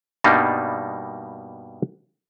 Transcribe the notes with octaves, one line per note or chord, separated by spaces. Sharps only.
G2 B2 G3 A#3 D4 D#4